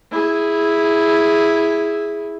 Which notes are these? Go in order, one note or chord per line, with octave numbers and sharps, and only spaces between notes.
E4 G#4